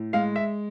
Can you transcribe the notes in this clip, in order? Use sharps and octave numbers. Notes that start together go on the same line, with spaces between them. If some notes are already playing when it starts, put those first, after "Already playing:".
Already playing: A2
G#3 F5
E5